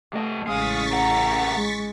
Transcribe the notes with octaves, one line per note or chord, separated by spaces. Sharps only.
C3 A3 D#5
A1 C#3 G#3 F5 C#6 D#6 A6 B6
C2 F#5 A#5
G#3